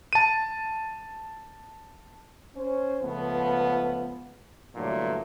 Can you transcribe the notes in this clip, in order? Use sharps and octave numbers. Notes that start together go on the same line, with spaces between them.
A5 D#7
C#4 C5
C#2 F3 A3 B3
G2 A#2 D3 E3 F#3 A3